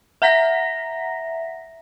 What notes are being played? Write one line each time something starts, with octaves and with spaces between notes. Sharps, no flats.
E5 F#5 A#5 A#6 B6